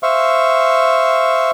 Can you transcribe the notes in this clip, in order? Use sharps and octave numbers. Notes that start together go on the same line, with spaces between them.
C5 E5 F5 C#6